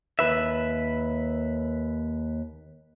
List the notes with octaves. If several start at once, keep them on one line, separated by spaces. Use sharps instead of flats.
D#2 B4 E5